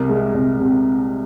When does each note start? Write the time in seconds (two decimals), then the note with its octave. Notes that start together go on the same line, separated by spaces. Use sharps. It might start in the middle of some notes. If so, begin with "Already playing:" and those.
Already playing: C2 A#4
0.09 G#3
0.34 C2
0.60 C3